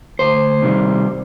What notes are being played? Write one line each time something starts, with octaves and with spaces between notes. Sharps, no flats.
D2 C5
C3 D#3 G3